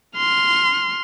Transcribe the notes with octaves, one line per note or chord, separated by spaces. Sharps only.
C6 F6